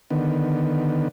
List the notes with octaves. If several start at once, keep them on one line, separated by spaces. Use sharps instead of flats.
D3 D#3 B3